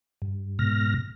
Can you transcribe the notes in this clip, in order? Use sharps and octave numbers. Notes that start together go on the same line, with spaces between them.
G2
G#2 B2 F6 A#6